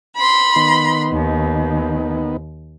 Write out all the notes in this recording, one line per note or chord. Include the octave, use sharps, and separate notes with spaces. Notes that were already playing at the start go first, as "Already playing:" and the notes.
B5 C6
D#3 B3
D#2